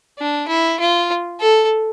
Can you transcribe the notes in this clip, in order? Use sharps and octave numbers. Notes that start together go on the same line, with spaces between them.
D4
E4
F4
A4